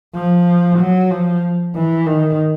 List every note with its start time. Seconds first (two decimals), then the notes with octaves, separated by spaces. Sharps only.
0.15 F3
0.79 F#3
1.10 F3
1.75 E3
2.07 D#3